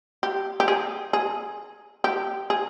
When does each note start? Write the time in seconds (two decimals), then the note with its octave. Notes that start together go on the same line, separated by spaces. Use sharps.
0.23 G4
0.60 G4
0.68 G#4
1.13 G#4
2.04 G4
2.50 G#4